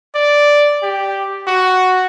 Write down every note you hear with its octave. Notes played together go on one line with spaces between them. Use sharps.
D5
G4
F#4